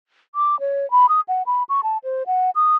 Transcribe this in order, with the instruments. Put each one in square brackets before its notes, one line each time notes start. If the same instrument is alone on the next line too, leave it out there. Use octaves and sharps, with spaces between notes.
[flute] D6
C#5
B5
D#6
F#5
B5
C#6
A5
C5
F#5
D#6